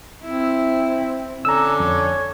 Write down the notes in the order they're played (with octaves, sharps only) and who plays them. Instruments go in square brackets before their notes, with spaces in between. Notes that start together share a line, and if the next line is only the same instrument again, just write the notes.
[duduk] C4 [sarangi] E4
[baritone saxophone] D3 [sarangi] C#4 [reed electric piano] A#5 E6
[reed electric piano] F2 [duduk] C#5